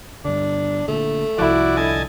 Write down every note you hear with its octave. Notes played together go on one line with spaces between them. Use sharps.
G2 D3 D4
A#2 D3 A3
C2 F3 E4 F#4 D5
D3 D#5 G#5 A5